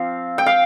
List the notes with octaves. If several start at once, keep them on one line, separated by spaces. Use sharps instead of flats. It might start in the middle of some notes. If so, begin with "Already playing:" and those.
Already playing: F3 C4 F5
G5
F5